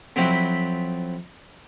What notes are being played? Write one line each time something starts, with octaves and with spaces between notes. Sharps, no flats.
F2 F#3 C4 E4 B5